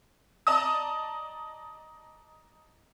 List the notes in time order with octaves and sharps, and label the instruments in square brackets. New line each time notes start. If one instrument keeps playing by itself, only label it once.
[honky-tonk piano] D5 D#5 A5 A#5 D#6